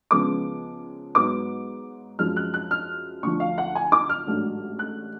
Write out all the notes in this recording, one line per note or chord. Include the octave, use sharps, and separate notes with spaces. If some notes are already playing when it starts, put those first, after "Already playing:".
C#2 C#3 F3 G#3 B3 D6
G#2 F#3 B3 D6
F#2 F3 G#3 F6
F#6
F#6
F6
D2 D3 F3 C#6
F5
F#5
G#5
D6
F6
A1 G#2 F#3 A3 D4
F#6